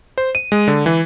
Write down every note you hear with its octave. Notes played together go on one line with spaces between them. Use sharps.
C5
D#7
G#3
D3
E3